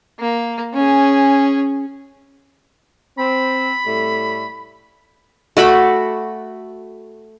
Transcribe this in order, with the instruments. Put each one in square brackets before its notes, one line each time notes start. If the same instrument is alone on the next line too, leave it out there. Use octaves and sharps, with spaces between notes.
[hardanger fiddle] A#3
C#4 G#4
[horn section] C4 [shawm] B5
[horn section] A2 G3 A3
[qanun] A3 F#4 B5 D6